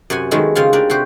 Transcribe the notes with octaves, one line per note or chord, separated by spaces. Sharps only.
F#2 C3 F#5 G#5
D#3 F#3 G#3 A3 B3
C#3 C4 F4 F5
D4 G4 A#4 D5
C3 F#4 G4 C5